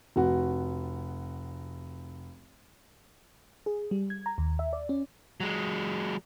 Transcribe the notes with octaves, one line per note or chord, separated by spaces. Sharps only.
F1 F#4
G#4
G3
G#6
A#5
D#2
E5
D5
C#4
F#3 G#3